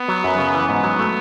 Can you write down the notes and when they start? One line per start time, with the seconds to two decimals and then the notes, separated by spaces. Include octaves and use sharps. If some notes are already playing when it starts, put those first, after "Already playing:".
Already playing: B3
0.08 F#3
0.24 F#2
0.38 C#3
0.54 E3
0.69 G#2 B3
0.83 F#3
0.99 A3